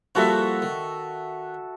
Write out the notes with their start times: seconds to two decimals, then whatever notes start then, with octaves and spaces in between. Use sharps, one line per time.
0.15 F3 G3 A#3 F#4 A4 E5
0.62 D#3